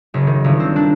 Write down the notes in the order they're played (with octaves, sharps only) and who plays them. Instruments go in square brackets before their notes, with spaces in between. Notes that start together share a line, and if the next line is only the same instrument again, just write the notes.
[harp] F#1
D#3
G1
C4
D4